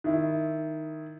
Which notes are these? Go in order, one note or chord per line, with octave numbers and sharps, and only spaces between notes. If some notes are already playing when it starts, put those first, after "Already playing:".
D#3 E4